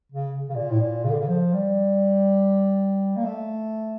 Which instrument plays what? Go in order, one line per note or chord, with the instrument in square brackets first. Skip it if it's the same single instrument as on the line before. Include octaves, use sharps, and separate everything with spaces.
[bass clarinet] C#3
C#3
A#2
A2
A#2
C#3
D3
C#3
F3
G3
A#3
A3